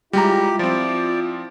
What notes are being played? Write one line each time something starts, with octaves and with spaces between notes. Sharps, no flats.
G3 G#3 E4 F4 G4 A#5
F3 C4 D5